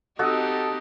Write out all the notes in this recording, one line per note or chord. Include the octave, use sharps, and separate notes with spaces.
C4 D#4 F#4 G4 A4 D#5 F#5